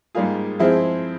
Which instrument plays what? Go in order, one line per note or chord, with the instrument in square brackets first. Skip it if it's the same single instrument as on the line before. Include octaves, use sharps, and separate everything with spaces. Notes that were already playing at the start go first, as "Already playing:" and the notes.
[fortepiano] G#2 G3 A#3 F4 G#4
F3 G#3 C4 E4 G#4